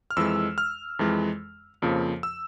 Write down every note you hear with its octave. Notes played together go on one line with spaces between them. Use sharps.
F6
F2 E3 G#3 E6
F6
F2 E3 G#3
F2 C#3 F3 A#3
E6